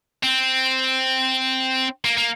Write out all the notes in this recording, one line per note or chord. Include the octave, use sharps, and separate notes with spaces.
C4
A#3
A#3